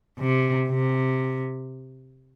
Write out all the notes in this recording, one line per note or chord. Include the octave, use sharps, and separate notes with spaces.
C3
C3